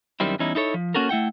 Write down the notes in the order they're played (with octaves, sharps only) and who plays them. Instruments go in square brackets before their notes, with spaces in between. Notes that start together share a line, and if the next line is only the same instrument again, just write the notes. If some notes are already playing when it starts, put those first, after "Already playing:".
[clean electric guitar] F#2 D#3 G3 C4 E4
E2 G3 C#4 D#4 E4
D#4 E4 A4 C#5
F3
A#3 C#4 F#4 A4 A#4
A3 E4 F#5 G5